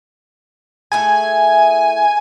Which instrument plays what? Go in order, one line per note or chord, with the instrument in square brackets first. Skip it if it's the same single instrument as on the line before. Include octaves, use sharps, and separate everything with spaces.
[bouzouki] A3 E4 G#4 [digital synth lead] G#5